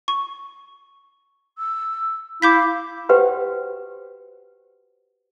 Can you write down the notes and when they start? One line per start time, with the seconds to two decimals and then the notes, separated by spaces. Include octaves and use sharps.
0.08 C#6
1.58 E6
2.42 E4 F5 D6 G6 B6
3.09 F#4 G4 B4 C5 F#5 G5